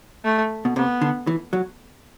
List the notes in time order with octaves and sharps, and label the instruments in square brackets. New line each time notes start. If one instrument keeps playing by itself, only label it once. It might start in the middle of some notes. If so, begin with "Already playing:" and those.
[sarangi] A3
[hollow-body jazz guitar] B2
[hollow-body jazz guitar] C3 [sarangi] B3
[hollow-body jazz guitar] D3
E3
F#3